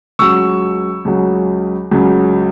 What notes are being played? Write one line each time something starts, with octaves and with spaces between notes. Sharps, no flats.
C#2 C#3 F#3 C#6 E6
C#2 C#3 F#3
C#2 C#3 F#3